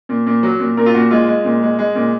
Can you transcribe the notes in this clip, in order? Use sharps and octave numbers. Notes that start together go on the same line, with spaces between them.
A#2
A#2
F#3
A#2
A#2 A#4
F4
A#2 F#4
G#3 F4
G#3
A#2
G#3
G#3
A#2